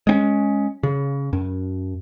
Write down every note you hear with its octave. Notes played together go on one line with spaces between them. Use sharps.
G#3 C4 C#4
C#3
F#2